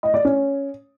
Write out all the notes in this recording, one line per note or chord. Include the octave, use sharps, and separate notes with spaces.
D#5
D5
C#4